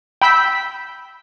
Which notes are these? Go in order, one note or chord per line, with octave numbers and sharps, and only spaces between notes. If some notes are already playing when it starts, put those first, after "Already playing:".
G5 B5 E6 G6 B6